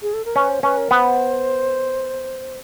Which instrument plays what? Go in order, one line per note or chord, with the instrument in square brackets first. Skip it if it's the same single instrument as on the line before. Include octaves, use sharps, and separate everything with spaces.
[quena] G#4
A4
A#4
[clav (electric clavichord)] C#4 [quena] B4
[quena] C5
[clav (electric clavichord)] C#4 [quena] B4
[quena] A#4
[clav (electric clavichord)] B3 [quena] C5